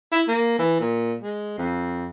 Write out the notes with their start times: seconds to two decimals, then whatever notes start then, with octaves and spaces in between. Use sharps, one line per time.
0.12 E4
0.28 A#3
0.59 E3
0.80 A#2
1.21 G#3
1.58 F2